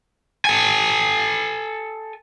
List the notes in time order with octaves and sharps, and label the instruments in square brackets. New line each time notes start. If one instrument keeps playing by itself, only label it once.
[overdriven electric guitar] A4 G#5